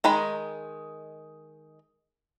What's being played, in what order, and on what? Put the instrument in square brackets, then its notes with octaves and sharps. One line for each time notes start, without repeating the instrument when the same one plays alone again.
[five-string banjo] D#3 G#3 D#4 B5